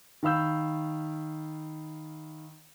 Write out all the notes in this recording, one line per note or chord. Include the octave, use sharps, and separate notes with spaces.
D#3 F5 B5 E6 G6